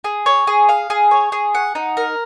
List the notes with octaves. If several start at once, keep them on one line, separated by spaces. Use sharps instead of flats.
G#4
C#5
G#4
F5
G#4
C#5
G#4
F#5
D#4
A#4